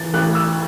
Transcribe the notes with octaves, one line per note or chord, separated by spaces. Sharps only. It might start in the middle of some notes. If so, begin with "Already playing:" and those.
Already playing: E3 A6
A1 F#6
E6